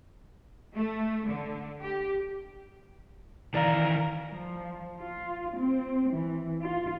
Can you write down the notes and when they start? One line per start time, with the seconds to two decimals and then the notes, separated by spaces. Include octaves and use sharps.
0.75 A3
1.27 D3
1.80 G4
3.54 D#3 E3 A#4 D5 F5
4.31 F3
4.99 F4
5.57 C4
6.11 E3
6.61 F4